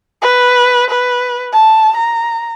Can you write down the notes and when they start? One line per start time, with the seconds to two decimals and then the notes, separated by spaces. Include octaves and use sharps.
0.22 B4
0.90 B4
1.53 A5
1.97 A#5